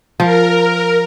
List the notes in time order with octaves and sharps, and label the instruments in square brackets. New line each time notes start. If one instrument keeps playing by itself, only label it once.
[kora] F3 [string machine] A#4